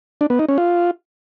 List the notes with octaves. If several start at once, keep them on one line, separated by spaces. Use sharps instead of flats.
D4
B3
D#4
C#4
F4